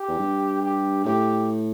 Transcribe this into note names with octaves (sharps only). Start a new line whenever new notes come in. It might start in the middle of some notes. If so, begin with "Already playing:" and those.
Already playing: G4
E2
G2
G4
A2 G4